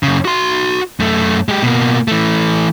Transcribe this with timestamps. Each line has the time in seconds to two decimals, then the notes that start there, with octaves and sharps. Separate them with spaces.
0.03 F#2 C#3
0.25 F#4 C6
1.00 F#2 A3
1.49 G#3 G4
1.63 B2 A#3
2.08 E3 A3